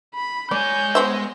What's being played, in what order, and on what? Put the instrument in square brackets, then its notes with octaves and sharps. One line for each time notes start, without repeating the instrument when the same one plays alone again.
[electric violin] B5
[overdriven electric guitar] G#3 G#5 [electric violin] C#5 G6 [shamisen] D5
[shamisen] B3 C5 E5